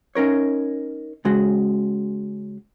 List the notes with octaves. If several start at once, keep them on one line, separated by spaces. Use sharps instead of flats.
C#4 D#4 A#4 C#5
C#3 G#3 F#4